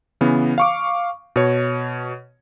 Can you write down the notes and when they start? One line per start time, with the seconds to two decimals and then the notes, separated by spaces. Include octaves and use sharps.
0.21 C#3 E3 B3
0.58 F5 C#6 D6
1.36 B2 C#5